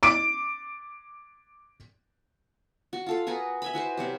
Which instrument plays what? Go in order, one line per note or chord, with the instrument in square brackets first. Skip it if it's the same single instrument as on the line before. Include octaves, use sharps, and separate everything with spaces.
[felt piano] D6 D7
[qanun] F#4
F4 A4 F5
F#4 G#4 A#4 B4
E5 G#5 B5
E4 F#4 B4 C5
C3 F#3 G4